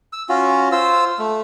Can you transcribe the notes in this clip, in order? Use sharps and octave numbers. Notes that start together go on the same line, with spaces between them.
E6
C#4 F4 F#4
F4 C5 E6
A3